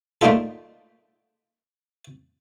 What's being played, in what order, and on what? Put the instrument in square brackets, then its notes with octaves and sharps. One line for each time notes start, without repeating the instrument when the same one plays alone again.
[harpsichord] A3 A#3 D4 D#4 F4 A4